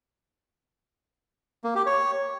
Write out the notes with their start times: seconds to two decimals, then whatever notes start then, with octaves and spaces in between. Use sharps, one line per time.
1.64 A#3
1.75 G4
1.86 C#5